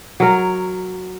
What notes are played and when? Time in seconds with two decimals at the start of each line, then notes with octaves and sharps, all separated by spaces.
0.20 F#3 A#4